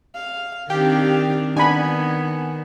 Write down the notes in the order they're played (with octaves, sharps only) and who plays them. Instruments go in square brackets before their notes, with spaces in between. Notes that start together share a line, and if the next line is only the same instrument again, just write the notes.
[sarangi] F5
[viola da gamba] D#3 C4 D4 [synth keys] G4 [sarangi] F5
[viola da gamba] D#3 [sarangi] B3 [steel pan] D4 B5 [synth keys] G#5